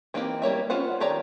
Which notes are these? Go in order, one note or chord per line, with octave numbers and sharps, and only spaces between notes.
E3 A#3 C4 D#4 G4
G3 A#3 C#5 E5
B3 C#4 F4 C5 F#5
D#3 G4 C#5 D5 A#5